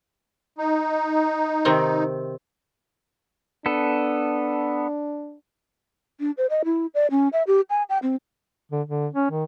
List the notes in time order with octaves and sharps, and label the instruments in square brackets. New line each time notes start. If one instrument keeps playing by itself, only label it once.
[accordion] D#4
[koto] C3 D#3 C4
[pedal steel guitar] B3 A4 [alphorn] D4
[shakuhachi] D4
C5
D#5
E4
D5
C#4
E5
G4
G#5
G5
C4
[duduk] D3
D3
C#4
D#3